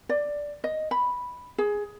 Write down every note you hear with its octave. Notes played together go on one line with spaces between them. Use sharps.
D5
D#5
B5
G#4